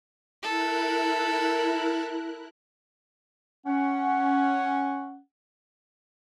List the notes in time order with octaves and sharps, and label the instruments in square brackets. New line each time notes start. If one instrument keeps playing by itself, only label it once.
[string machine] E4 A#4 F#6 [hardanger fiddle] A4
[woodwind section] C#4 F#5